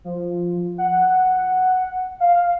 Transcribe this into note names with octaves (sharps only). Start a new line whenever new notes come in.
F3
F#5
F5